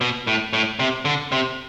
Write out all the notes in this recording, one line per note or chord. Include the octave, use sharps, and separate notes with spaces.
B2
A2
A2
C3
D3
C3